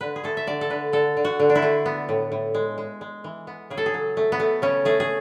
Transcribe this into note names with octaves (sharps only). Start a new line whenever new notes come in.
D3 B4
G#4
A3 A4
E5
D3 D5
A4
D3 B4
D3 A4
D3
F#4
D3
D4
E4
A3
B3
A2
A2
G#3
G#3
G#3
E3
B3
C#3 G#4
A4
G#4
F#3
A3
B3
A3
C#3 C#4
A3 G#4
G#4